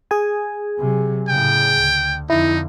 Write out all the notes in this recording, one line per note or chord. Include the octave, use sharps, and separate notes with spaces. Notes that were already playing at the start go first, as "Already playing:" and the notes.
G#4 G#5
C3 F#3
A2 C#3 G5
D2
F2 D3 D#4 E4